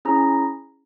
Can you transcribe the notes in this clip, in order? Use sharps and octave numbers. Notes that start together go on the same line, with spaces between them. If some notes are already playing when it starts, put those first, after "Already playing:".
C#4 E4 G#4 A#5